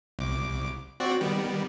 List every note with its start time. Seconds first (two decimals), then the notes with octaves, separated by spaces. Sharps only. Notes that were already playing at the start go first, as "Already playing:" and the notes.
0.19 C2 D6
1.00 C4 F#4 D5
1.21 D#3 G3 B3